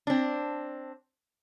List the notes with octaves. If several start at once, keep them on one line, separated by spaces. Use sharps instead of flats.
C4 D4